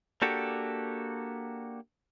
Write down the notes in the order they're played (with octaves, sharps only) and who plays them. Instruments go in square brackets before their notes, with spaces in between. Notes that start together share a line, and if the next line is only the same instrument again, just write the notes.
[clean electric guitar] A#3 D4 F#4 G4 A4